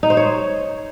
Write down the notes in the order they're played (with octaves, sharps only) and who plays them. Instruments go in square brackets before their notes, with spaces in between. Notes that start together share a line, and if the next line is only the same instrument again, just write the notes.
[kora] D#4
C5
C#5